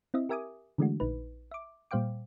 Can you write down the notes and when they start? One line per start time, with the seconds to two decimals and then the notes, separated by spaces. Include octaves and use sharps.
0.14 C4 E4 D#5 E5
0.29 G4 A#4 E5 G#5 D6 D#6
0.78 D3 E3 G#3 A3 D4 F#4
1.00 A#1 D#4 B4
1.51 E5 D6
1.91 A#2 G3 C5 F5 G5 D6